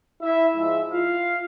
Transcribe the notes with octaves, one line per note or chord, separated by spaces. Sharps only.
E4 E5
G#2 F3 G#3 E4 E5
F4 F5